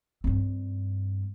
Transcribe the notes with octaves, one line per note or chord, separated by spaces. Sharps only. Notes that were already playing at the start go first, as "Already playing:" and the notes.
G2 C4